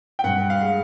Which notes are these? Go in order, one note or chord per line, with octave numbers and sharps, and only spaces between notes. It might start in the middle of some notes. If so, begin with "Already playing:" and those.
G5
G2 F#5
F5
G#3